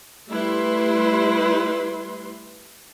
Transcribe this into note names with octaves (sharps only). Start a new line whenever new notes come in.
G3 A3 E4 B4 C6